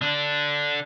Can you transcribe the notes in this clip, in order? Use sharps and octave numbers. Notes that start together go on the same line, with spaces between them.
D3 D4